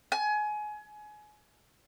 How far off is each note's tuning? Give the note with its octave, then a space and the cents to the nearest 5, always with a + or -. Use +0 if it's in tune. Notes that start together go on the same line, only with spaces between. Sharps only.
G#5 +25